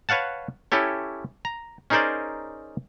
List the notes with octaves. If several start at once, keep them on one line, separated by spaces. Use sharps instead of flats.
B4 C#5 F5 F#5 A5
C#4 E4 G4 A4 C#5
A#5
C#4 D#4 G#4 A#4 C5 D5